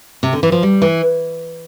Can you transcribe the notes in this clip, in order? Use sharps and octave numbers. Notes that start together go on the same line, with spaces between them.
C3
D3
E3
F3
G3
E3